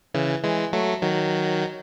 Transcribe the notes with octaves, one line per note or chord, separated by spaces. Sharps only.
C#3 E3
E3 G#3
F#3 A3
D#3 F#3